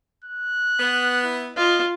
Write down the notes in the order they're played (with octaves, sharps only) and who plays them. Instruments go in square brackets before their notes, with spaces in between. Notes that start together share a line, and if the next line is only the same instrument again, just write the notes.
[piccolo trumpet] F#6
[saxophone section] B3
[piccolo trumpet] E4
[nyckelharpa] F4 [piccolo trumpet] D#5